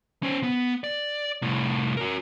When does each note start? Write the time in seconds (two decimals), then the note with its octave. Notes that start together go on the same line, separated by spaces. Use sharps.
0.23 C#4 C5
0.43 B3
0.84 D5
1.42 C2 A2
1.97 F#4 A#4